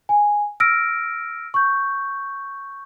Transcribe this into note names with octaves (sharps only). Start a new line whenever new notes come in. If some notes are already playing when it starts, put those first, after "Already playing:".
G#5
E6 F6 A#6 D7
C#6 G6